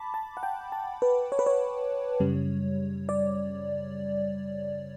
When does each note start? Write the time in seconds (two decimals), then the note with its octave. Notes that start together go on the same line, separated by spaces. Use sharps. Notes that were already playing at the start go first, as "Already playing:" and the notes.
Already playing: A5 B5 D6
0.14 A5
0.37 F#5
0.43 G5
0.72 A5
1.02 B4
1.32 C#5
1.39 B4
1.46 C#5
2.20 F#2 C#3 G3
3.09 D5